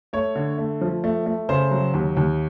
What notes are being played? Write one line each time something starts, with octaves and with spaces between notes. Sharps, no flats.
A3 C#5
D3
A3
F3
A3
A3
C#3 C5
F#3
D#2
D#2